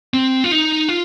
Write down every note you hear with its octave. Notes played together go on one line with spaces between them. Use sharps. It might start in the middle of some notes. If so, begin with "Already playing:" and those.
C4
F4
D#4
F4